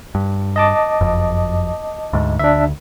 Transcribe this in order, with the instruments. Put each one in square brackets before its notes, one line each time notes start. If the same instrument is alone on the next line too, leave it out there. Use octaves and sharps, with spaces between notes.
[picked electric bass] G2
[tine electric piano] D#5 A5 D6
[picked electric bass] F#1 F2
D2 G#2
[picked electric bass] D2 [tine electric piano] D4 E5